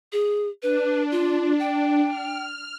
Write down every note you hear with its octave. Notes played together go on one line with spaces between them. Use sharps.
G#4
D4 B4
F4
G5
F6